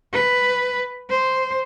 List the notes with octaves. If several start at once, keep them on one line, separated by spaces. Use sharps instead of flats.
B4
C5